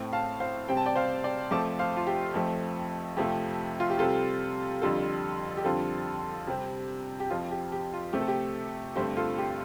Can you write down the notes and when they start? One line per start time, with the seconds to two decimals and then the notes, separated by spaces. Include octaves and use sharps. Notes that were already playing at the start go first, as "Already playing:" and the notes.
Already playing: A2 A3 C4
0.13 F5 A5
0.40 C5 F5
0.68 C3 G3 C4 G5
0.77 A5
0.86 D5 G5
0.95 C5 F5
1.24 D5 G5
1.51 F2 F3 A3 C4 A5 D6
1.79 C5 F5
1.97 F4
2.07 G4
2.34 F2 F3 A3 C4
3.17 F2 C3 F3 A3 G4
3.80 F4
3.90 G4
3.99 C3 G3 C4 F4 A4
4.82 F2 D3 G3 F4 A4
5.57 G4
5.64 F2 D3 G3 C4 F4 A4
6.47 C3 G3 C4
7.20 G4
7.30 F2 F3 C4 F4
7.51 G4
7.72 G4
7.93 F4
8.13 C3 A3 C4 G4
8.21 A4
8.28 G4
8.96 G2 D3 A3 C4 G4 C5
9.17 F4 A4
9.38 G4